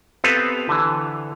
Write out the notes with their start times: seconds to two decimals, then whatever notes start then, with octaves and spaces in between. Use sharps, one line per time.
0.24 B3 C4 G4 A4 B4 F5
0.69 D3 E3